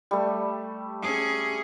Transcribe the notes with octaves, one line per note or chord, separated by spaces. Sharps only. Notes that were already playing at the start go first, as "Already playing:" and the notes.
G3 A3
C#4 G#4